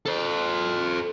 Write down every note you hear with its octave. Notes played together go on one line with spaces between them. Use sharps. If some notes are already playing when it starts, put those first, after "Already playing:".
A4 C5